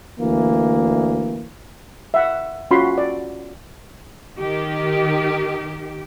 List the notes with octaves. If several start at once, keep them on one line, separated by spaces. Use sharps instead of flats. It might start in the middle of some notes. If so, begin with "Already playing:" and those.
D2 E3 A#3
E5 F#5
C#4 F4 F#4 B5 C6
D5
D#3 G4